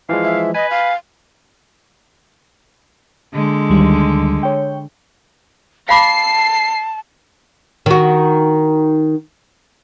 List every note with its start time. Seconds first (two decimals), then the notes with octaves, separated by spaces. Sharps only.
0.09 E3 F3 G#3 F5
0.24 E5
0.54 B4 D#5 G#5
0.71 F5
3.34 D3 G#3
3.70 D2 D#3 G3
4.43 C#5 G5
5.89 F5 A5 B5 D6 C7
7.86 D#3 F#4